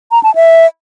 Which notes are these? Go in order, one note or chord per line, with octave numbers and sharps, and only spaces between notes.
A#5
A5
E5